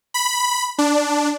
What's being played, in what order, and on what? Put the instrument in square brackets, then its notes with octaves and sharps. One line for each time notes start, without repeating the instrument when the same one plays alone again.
[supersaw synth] B5
D4